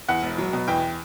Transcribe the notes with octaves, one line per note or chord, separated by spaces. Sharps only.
E2 F#5
E1
F#3
B2
E2 G5